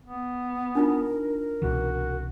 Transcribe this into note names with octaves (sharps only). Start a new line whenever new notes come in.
B3
D4 D#4 F4 A#4
C2 B2 E3 F#4